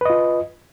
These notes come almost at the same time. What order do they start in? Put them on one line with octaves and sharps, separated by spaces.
B4 D#5 F4